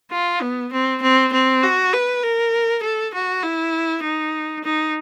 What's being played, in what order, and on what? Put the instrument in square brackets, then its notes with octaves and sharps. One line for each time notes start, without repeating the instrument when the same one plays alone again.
[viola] F4
B3
C4
C4
C4
F#4
B4
A#4
A4
F#4
E4
D#4
D#4